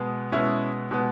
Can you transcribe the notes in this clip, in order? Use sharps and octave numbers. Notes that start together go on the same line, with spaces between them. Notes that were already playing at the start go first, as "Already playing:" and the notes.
Already playing: B2 G#3 B3
B2 G#3 B3 C#4 E4
B2 G#3 B3